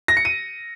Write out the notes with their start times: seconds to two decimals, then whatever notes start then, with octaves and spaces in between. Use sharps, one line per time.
0.08 A#6
0.17 C#7
0.25 D#7